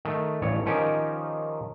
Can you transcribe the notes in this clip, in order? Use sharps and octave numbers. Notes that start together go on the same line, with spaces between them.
D#3 A3
A1 G2 C#5
D#3 F3 C#4 D#4 G4 A#4